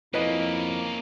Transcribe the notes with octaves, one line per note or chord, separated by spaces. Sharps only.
F2 A#3 C#4 E4 B4 D#5